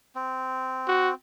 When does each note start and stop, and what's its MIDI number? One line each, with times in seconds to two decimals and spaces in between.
0.15 1.14 60
0.88 1.11 66